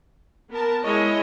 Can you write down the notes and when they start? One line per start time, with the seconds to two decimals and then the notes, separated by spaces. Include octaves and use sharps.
0.50 B3 A#4 A5
0.83 G#3 E4 C#5 D#5